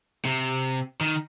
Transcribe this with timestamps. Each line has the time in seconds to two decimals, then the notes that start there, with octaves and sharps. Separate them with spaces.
0.25 C3
1.01 D#3